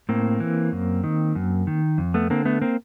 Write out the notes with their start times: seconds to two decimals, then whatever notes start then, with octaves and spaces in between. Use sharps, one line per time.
0.09 A2 A#3 C4
0.40 E3
0.72 F#2
1.04 D#3
1.35 F#2
1.67 D#3
1.98 F2
2.14 A3 B3
2.30 D3 A#3 C4
2.45 A3 B3
2.61 A#3 C4